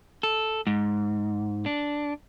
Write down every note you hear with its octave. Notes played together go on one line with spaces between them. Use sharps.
A4
G#2
D4